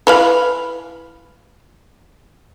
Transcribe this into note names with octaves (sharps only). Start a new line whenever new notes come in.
E3 B4 F5